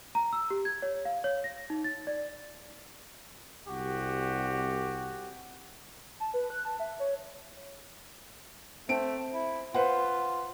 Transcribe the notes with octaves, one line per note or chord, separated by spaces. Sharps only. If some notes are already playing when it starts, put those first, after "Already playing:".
A#5
E6
G4
G#6
C#5
F5
C#5
A#6
D#4
A6
D5
C2 F#4 G4
A5
B4
F#6
A5
E5
C#5
A3 C4 D7
E4
F4 B4 C5 F#5